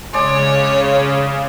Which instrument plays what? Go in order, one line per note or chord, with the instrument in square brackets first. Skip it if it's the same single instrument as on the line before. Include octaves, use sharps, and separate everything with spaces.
[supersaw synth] C#3 [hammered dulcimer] G#3 D5 G#5 [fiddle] C#5